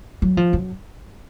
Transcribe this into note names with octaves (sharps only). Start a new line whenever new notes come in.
F#3
F3
F#2